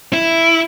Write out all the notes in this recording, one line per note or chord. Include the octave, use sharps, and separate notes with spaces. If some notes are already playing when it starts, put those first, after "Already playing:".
E4